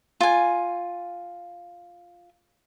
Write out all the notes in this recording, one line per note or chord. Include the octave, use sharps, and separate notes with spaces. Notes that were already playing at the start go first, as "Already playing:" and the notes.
F4 G#5